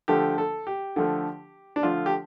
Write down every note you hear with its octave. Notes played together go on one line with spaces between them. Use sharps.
D3 F3 A3 G4
A4
G4
D3 F3 A3
D4
D3 F3 A3 F4
G4